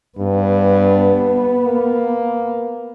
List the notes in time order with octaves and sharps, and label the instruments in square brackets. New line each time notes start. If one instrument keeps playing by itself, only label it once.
[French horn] G2 [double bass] B3
[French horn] A#3